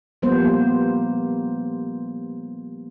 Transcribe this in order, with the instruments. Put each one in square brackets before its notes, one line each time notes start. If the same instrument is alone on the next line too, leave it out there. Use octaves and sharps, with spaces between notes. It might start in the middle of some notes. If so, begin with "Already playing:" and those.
[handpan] F3 G3 A#3 B3 C5